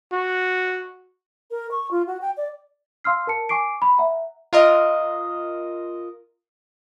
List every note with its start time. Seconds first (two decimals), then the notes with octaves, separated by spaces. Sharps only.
0.13 F#4
1.51 A#4
1.71 C#6
1.91 F4
2.07 F#4
2.21 G5
2.37 D5
3.04 F5 C6 E6 F6 C7
3.27 A#4 A5 C#7
3.49 G#5 C#6 D6 C7 D7
3.82 B5
3.98 E5 F#5 A#5
4.53 F4 A#4 D#5